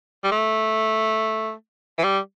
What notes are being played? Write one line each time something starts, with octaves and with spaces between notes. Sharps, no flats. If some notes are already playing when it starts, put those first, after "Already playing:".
G3
A3
E3
G3